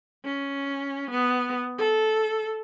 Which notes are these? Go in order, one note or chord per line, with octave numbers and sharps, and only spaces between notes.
C#4
B3
A4